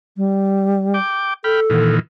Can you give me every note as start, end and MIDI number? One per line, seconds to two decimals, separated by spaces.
0.17 0.99 55
0.94 1.34 79
0.94 1.34 86
1.44 1.95 69
1.44 1.60 79
1.44 1.60 83
1.44 1.60 89
1.70 1.99 46
1.70 1.99 51
1.70 1.99 52